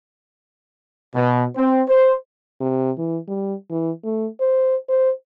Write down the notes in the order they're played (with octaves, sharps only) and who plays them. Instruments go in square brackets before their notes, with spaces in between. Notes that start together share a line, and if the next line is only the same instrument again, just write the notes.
[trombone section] B2
C4
C5
[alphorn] C3
E3
G3
E3
A3
C5
C5